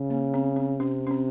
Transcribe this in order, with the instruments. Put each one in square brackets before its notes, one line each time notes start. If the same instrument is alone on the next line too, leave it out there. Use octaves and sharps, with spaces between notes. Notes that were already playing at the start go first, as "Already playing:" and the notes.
Already playing: [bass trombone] C#3
[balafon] A#3
C4
C4
[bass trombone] C3 [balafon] C#4
[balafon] C#4
C4